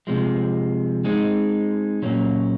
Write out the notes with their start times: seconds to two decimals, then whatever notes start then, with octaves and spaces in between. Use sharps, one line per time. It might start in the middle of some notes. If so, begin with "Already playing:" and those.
0.07 C3 F3 G#3
1.04 G#3 C4 D#4
2.02 A#2 F#3 A#3 C#4